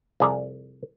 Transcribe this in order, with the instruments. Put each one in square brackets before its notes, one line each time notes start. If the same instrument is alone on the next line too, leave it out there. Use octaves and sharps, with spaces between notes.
[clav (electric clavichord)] C2 F2 G#4 D5 E5 A#5